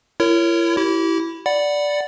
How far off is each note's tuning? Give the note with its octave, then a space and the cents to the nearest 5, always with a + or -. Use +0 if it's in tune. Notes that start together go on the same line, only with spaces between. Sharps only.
E4 +40 A#4 -20 C#5 +0
E4 +0 G4 -35
D5 -5 F#5 -5 B5 +0